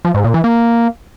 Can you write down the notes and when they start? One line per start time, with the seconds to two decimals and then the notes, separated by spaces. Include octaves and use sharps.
0.05 F3
0.14 G#2
0.24 A#2
0.34 E3
0.44 A#3